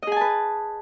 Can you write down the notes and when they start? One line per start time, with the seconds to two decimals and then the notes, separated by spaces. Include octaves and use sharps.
0.03 D#5
0.07 G#4
0.12 G#5
0.16 A5
0.21 B4